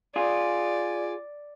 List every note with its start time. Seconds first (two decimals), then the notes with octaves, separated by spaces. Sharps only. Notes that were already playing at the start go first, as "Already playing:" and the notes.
0.16 F4 G#4 D5